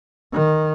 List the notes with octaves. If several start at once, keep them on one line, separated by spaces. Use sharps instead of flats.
D#3